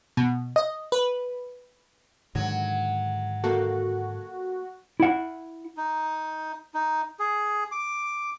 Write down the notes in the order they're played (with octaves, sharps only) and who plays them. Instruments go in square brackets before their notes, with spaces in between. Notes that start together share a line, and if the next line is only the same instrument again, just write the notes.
[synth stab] B2
D#5
B4
[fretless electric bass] G#2 D3 D#3 [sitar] F#3
[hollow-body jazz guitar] A#3 A4 [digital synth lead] F#4
[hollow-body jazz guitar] E4 F#5
[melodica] D#4
D#4
G#4
D6